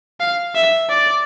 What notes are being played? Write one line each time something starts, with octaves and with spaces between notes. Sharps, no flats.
F5
E5
D5